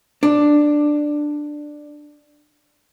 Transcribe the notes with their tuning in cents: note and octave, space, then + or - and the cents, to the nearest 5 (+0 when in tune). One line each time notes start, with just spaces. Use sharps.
D4 +10